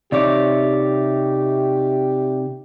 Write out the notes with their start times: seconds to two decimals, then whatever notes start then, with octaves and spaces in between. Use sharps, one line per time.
0.12 C3 D#4 G4 C#5 D5 E5 D6